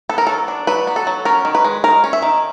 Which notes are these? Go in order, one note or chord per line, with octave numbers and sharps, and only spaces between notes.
B3 A4
A#4
F#3 A4
D4
F#3 B4
B3
A4
F#3
C#4 A#4
D#3
B4
G#3
D#3 A#4
C#4
E5
D#3